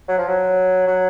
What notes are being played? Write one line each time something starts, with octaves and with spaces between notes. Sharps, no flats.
F#3
F3
F#3
F#3